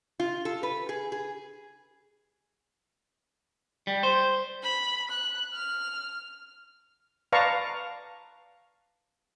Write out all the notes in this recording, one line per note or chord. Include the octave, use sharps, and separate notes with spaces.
F4
A4
B4
G#4
G#4
G3
C5
B5
F#6
F6
B4 D5 F5 A5 A#5 C#6